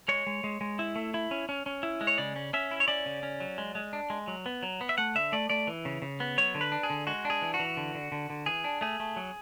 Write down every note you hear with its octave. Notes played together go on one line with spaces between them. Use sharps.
G#3 C#5
G#3
G#3
G#3
E4
A3
E4
C#4
C#4
C#4
E4
G#3
C#5
C#3 D5
C#4
C#4 E5
E4
C#5
C#4 D5
C#3
C#4
F#3
G#3
G#3
D4
G#3
F#3
B3
F#3
B3
E5
A3 F#5
D3 E5
A3 D5
A3 D5
E3
C#3
C#3
B3
F#3 C#5
D3
B4
D4
G#4
D3
G#3 F#4
D4
G#4
E3
F#4
E3
D3
D3
D3
D3
E3 G#4
D4
A3 G#4
A3
F#3